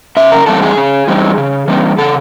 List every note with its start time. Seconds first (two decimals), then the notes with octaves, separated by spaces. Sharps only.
0.17 C#3 E5
0.32 A#4
0.46 E3 G3 C4 D#4 A4
0.62 G#4
0.78 C#3
1.08 E3 G3 C4 D#4
1.38 C#3
1.68 E3 G3 C4 D#4
1.98 C#3 A4